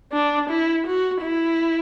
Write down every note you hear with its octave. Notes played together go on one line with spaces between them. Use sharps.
D4
E4
F#4
E4